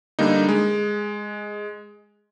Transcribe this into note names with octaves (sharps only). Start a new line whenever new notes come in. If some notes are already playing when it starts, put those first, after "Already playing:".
D3 G3 A#3 D#4
G#3